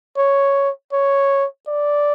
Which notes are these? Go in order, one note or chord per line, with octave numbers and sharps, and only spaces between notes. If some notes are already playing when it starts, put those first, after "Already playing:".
C#5
C#5
D5